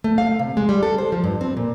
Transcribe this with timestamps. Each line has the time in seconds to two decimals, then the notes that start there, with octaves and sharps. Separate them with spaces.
0.04 A3
0.18 F5
0.39 C3
0.57 G#3
0.69 G3
0.83 A4
0.98 C5
1.12 F3
1.24 G2
1.41 C4
1.57 A#2